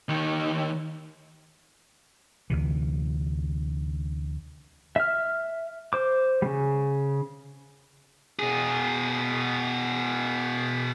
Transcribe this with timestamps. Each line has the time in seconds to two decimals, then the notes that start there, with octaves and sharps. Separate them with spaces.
0.09 D#2 D#3
2.50 D2 C3 E3
4.96 E5 F6
5.93 C5 D6
6.42 C#3 G3
8.39 B2 G#4